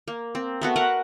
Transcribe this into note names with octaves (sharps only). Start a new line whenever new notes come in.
A#3
C4
A3 B3 F#4
A#4 B4 F#5